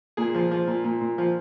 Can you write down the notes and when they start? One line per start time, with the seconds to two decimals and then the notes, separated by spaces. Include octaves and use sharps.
0.17 A#2 G#4
0.35 F3
0.51 F3
0.67 A#2
0.84 A#2
1.01 A#2
1.18 F3